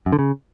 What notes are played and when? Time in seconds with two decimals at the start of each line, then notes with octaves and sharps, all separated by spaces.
0.06 F#2
0.12 D3
0.19 C#3